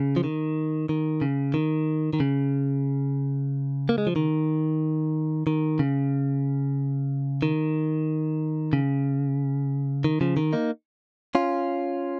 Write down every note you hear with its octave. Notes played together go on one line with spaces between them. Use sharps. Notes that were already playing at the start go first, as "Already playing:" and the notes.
Already playing: C#3
F3
D#3
D#3
C#3
D#3
D#3
C#3
A#3
G#3
F3
D#3
D#3
C#3
D#3
C#3
D#3
C#3 F3
D#3
A#3 D#4
C#4 F4